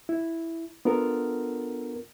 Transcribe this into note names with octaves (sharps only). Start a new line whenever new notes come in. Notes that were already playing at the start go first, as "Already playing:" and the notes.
E4
B3 D4 F4 A4 A#4